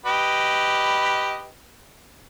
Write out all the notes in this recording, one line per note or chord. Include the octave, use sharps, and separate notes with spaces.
G4 B4 D#5